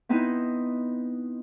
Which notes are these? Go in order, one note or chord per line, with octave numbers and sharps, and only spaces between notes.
B3 C4 D#4 E4